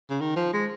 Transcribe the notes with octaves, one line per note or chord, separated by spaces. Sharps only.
C#3
D#3
F3
G#3